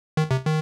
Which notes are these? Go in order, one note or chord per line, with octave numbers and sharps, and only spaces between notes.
D#3
C3
D#3